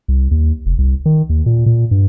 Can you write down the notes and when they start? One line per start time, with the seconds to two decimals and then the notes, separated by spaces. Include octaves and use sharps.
0.08 C2
0.31 D#2
0.66 F1
0.78 C2
1.06 D#3
1.30 D#2
1.46 A#2
1.66 A#2
1.91 G2